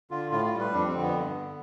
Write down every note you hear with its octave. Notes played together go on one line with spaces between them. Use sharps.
D3 F4
A2 F4
F4
G3
B4
F2 D4
C4
D3
B3
G2
D3